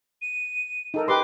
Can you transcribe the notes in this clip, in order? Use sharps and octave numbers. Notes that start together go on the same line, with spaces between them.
D#7
D#4 A4 A#4
G4 B4 C6 D6